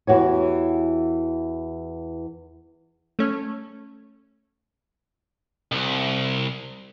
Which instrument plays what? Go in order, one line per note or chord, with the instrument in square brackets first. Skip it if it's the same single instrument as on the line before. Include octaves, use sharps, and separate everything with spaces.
[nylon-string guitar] E2 E3 F#4 G4 C#5
[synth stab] A3 C#4
[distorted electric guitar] C2